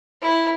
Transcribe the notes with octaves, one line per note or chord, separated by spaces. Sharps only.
E4